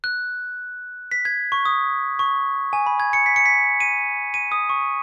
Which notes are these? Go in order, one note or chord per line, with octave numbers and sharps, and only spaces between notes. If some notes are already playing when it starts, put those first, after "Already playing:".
F#6
B6
G#6
C#6
D#6
C#6
G#5
B5
G#6
C#7
B6
C#7
B6
D#7
D#7
D#6
C#6